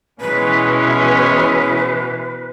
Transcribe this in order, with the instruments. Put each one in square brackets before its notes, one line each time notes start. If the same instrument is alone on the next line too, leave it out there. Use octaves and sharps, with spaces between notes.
[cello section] B2 E3 [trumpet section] G#3 C#4 [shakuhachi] B4